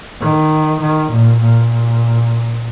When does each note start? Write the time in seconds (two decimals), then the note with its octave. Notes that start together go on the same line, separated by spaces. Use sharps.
0.20 D#3
0.80 D#3
1.10 A#2
1.40 A#2